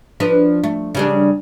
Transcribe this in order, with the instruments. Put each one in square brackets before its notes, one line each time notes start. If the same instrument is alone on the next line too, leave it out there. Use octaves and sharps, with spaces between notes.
[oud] F3 D4 B4
A3
C#3 G3 D4